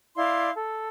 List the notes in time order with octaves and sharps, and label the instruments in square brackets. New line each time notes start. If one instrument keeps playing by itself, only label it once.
[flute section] E4 D5 F5 C6
A4